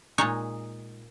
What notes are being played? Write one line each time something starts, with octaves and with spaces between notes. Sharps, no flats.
A#2 G#3 D#4 C#5